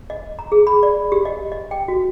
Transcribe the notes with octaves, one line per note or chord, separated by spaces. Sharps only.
D#5
A#5
G#4
B5
D5
G4
D#5
D#5
G5
F#4